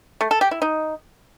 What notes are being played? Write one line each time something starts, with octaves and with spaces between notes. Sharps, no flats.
A3
A4
G4
E4
D#4